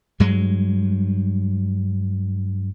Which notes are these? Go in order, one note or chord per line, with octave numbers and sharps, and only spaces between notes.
G2 F#3 G#3